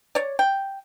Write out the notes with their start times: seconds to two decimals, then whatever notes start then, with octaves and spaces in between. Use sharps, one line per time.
0.15 C#5 D5
0.39 G5